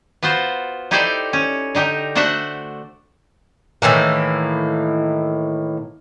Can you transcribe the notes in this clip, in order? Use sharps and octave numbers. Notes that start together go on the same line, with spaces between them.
B3 F4 F#4 C5
D#4 E4 G4 A4 C5 D5
C#4
D3 D#4 G4 A#4
A3 D4 F#4 C5 E5 F#5
A2 D#3 E3 A#3